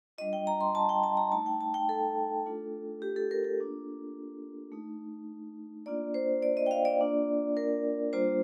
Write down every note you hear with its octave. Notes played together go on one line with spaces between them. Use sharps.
G3 D4 F4 D#5
G5
A#5
C6
A5
G5
A5
A#5
A3 D#4 A5
G5
A5
G5
A4
A3 D4 F4
G4
A4
A#4
A4
A#3 D4 F4
A3 D#4
A#3 D4 F4 D5
C5
D5
D#5
G5
F5
D5
A#3 D4 F4
A#4
G3 A#3 D4 F4 C5